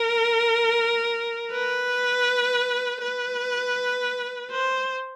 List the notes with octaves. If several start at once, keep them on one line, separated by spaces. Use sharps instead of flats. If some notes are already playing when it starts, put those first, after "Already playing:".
Already playing: A#4
B4
B4
C5